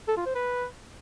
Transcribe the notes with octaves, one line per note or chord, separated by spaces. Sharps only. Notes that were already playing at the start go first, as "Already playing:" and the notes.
A4
F4
C5
B4